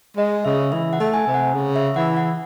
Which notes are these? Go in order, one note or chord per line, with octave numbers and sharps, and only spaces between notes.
G#3 D#5
C#3 E5
E3 E5
F#5
A3
G#5
C3
F#5
C#3
E5
E3 F#5
F#5